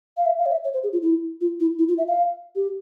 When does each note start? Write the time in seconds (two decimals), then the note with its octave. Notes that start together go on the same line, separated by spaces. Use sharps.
0.17 F5
0.26 E5
0.38 F5
0.46 C#5
0.51 E5
0.64 C#5
0.73 C5
0.83 G#4
0.93 F4
1.02 E4
1.41 F4
1.60 E4
1.79 E4
1.88 F4
1.98 E5
2.08 F5
2.55 G4